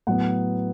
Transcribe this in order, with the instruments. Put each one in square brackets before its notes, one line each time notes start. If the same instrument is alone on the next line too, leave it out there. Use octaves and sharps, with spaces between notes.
[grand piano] A2 F#3 B3 F#5